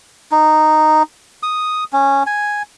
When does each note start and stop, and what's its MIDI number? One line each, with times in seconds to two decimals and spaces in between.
0.32 1.03 63
1.43 1.84 87
1.93 2.23 61
2.27 2.62 80